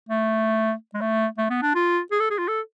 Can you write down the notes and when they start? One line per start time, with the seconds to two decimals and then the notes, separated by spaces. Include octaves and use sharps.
0.09 A3
0.94 G#3
1.01 A3
1.38 A3
1.50 B3
1.62 D4
1.75 F4
2.11 G#4
2.20 A4
2.30 G#4
2.39 F4
2.48 A4